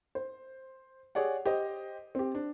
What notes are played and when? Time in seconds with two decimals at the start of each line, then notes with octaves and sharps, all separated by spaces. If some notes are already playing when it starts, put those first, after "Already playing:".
0.15 C5
1.15 G4 G#4 C#5 D5 F#5
1.46 G4 C5 D#5
2.15 C4 G4
2.35 D4